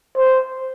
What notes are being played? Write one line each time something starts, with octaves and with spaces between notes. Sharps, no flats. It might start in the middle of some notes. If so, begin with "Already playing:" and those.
C5